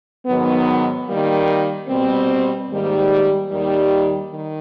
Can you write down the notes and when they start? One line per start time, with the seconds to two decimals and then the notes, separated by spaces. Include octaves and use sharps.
0.26 G#2 D#3 F#3 B3
1.07 D#3 G3 A#3
1.88 B2 G3 C4
2.69 G#2 D#3 G3 A#3
3.49 D#2 D#3 G3
4.31 D#3